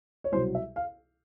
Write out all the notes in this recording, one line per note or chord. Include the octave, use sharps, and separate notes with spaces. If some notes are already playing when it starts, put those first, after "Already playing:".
C#5
C2 B2 F#3 C5
E5
F5